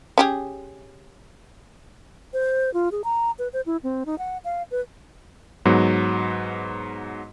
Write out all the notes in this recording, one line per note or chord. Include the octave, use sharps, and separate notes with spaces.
C#4 G4 G#4
C5
F4
G#4
A#5
B4
C5
E4
C4
D#4
F#5
F5
B4
G#2 F#3 B3